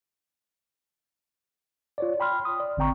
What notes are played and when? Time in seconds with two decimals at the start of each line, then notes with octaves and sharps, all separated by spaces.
1.98 F4 C#5 D5
2.20 G5 B5 C6 F6
2.45 D#6
2.60 D5
2.77 G#1 D3 C4 G5 A#5 C#6